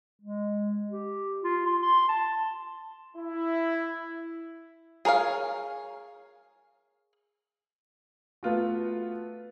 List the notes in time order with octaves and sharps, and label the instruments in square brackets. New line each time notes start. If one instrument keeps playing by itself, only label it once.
[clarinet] G#3
G4
F4
C6
C6
A5
[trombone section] E4
[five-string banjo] G#4 A#4 C#5 F5
[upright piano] A3 B3 F4 F#4